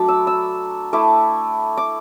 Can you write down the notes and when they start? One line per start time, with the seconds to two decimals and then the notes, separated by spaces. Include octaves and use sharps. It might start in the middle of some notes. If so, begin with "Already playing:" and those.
Already playing: F#3 A3 D4 A5 B5 D6
0.08 E6
0.27 E6
0.93 A3 E4 D6
1.77 D6